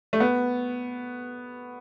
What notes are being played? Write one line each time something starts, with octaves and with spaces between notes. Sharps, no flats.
A3
B3